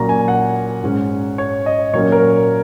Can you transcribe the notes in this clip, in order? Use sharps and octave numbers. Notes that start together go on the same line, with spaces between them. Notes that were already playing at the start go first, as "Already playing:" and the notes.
Already playing: A#2 F#3 A#3 C#4 A#5 C#6
G#5
F#5
G#2 G#3 C#4
C#5
D#5
A#2 F#3 A#3 C#4 C#5
A#4